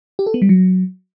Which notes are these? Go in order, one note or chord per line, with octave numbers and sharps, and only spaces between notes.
G4
A4
B3
G3
F#3